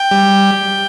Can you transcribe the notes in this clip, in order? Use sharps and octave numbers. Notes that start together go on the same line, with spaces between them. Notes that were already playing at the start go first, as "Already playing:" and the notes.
Already playing: G5
G3